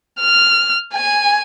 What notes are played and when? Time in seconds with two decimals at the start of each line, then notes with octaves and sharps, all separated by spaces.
0.20 F6
0.94 G#5